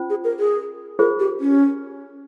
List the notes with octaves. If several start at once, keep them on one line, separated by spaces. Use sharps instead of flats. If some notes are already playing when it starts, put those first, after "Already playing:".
Already playing: C#4 F4 C5
G#4
A#4
G#4
F4 G#4 A#4 C5
G4
C#4